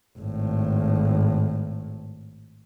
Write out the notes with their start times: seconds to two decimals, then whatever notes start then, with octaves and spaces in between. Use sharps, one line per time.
0.18 G#1 A2